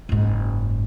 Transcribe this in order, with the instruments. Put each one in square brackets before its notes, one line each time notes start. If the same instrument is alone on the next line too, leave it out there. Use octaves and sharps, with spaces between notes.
[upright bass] F#1 G#2